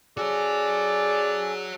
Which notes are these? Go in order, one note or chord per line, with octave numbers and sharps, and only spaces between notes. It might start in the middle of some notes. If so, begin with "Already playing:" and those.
C#4 F#4 G#4 A4 C#5 D5